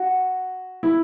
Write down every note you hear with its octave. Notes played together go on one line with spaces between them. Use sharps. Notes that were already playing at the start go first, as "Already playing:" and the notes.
Already playing: F#4
E4